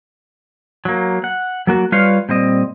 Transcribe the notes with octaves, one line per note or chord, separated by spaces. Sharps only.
F#3 A#3
F#5
F#3 A#3 F#4
G3 F4 B4 C#5 F5
A#2 G3 C4 D#5